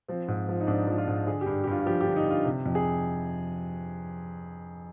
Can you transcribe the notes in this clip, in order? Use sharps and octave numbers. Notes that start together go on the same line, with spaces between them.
F3 C4
G#2
F3
D#4
G#2 D4
F3
F4
G#2
D3 G#4
G2 G4
G4
G2 F4
F4
F3 G4
G4
D3
D#4
G2 F4
C3
F2
G#4